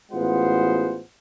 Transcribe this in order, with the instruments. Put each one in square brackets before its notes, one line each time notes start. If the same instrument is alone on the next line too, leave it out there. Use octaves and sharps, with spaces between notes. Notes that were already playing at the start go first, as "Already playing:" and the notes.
[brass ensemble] A1 G#3 B3 F4 C5 F#5